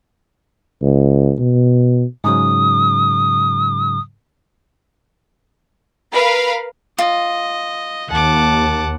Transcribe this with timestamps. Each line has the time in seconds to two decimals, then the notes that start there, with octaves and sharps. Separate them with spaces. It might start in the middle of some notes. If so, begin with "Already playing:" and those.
0.82 C#2
1.39 B2
2.24 G#2 C#3 F#3 D#6
6.13 A#4 B4 F5 B5
6.98 F4 D#5
8.11 D#2 F#5 A5 D6